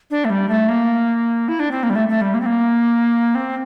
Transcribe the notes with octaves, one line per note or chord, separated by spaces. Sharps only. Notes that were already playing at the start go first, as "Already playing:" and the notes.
D4
A3
G3
A3
A#3
E4
D4
C4
A#3
G3
A3
A3
G3
A#3
C4
A#3
C4